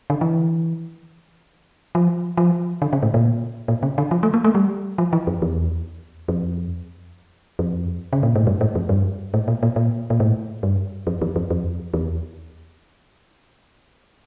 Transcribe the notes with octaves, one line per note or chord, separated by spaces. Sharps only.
D3
E3
F3
F3
D3
C#3
A2
A#2
A#2
C#3
D3
F3
A3
A#3
A3
G3
F3
E3
F2
E2
F2
F2
C#3
A#2
A2
G2
A2
F2
G2
A2
A#2
A#2
A#2
A#2
A2
G2
F2
E2
F2
F2
E2